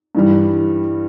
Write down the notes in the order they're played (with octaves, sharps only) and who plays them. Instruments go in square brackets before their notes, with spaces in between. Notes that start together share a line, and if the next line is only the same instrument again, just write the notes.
[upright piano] G2 E3 G3